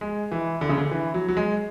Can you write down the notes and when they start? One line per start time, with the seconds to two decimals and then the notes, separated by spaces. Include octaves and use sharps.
0.01 G#3
0.32 E3
0.61 D3
0.69 C#3
0.77 D3
0.91 E3
1.14 F#3
1.28 F#3
1.37 G#3